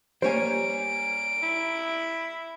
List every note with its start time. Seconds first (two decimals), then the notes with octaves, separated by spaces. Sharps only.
0.22 G3 A#3 C5 C#5 G#5 D7
1.43 E4